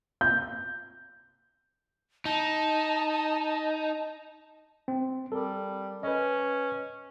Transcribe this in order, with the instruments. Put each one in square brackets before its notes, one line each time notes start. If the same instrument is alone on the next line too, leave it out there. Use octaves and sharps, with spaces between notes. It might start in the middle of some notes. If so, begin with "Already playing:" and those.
[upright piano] G6
[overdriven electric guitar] D#4 [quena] A5
[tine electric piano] C4
[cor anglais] G3 [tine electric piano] A4 A#4
[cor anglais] C#4 [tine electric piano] B4 D#5